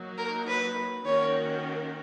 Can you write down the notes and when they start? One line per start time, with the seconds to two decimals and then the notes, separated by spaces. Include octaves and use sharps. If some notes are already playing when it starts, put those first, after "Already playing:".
Already playing: F#3 A#3 D#4 F#4
0.18 A#4
0.47 B4
1.06 D#3 A#3 C#4 F#4 A#4 C#5